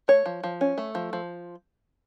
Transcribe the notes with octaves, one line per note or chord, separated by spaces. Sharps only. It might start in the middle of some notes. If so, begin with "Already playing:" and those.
A3 C#5
F3
F3
C#4
A3
F3
F3